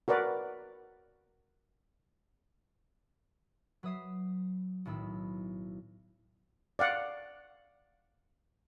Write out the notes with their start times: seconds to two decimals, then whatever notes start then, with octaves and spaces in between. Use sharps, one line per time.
0.08 F#4 A#4 B4 D5
3.83 F#3 B4 E5 D#6 B6 C7
4.85 B1 A2 D#3 B5 E6
6.79 D5 F5 F#5